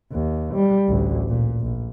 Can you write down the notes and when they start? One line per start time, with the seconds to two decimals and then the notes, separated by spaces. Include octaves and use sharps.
0.12 D#2
0.55 G3
0.88 A1 D2
1.29 A#2
1.61 A#1